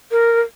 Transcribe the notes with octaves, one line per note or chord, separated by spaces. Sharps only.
A#4